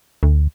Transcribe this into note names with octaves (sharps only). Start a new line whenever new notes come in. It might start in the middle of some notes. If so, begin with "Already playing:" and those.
D2